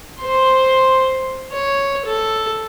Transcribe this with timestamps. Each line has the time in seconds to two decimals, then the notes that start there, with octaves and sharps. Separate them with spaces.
0.20 C5 C6
1.53 C#5
2.06 A4